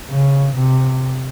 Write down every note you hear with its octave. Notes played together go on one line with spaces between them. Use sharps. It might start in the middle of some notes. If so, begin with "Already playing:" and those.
C#3
C3